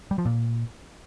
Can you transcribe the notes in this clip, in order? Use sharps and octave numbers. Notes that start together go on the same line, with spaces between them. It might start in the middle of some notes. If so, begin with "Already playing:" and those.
G3
F3
A#2